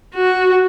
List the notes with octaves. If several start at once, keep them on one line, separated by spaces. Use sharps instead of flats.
F#4